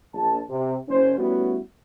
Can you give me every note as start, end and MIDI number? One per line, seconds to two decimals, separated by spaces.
0.14 0.39 34
0.14 0.39 81
0.50 0.76 48
0.88 1.15 30
0.88 1.15 61
0.88 1.15 72
1.18 1.58 55
1.18 1.58 57
1.18 1.58 59
1.18 1.58 61
1.18 1.58 64
1.18 1.58 66